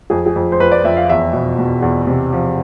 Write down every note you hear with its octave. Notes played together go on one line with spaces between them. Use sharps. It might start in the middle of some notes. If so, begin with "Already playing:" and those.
F2 G#4
G#4
F2
C5
F2 B4
D5
F2 E5
F5
E2 E5
B2
B2
E2
C3
F3